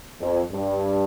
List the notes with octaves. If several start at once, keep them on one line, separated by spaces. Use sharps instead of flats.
F2
G2